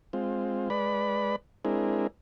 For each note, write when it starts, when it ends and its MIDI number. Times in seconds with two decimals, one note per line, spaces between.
0.13 0.69 56
0.13 0.69 60
0.13 0.69 65
0.70 1.36 56
0.70 1.36 71
0.70 1.36 74
0.70 1.36 83
1.65 2.07 56
1.65 2.07 60
1.65 2.07 62
1.65 2.07 64
1.65 2.07 68
1.65 2.07 70